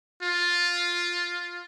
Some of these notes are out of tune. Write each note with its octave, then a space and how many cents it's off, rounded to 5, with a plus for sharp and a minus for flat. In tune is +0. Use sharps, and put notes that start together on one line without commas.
F4 +5